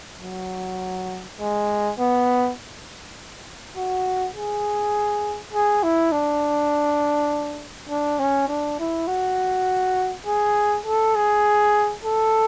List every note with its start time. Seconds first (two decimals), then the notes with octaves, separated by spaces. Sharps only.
0.21 F#3
1.39 G#3
1.98 B3
3.76 F#4
4.35 G#4
5.53 G#4
5.83 E4
6.12 D4
7.89 D4
8.19 C#4
8.48 D4
8.79 E4
9.07 F#4
10.26 G#4
10.86 A4
11.15 G#4
12.04 A4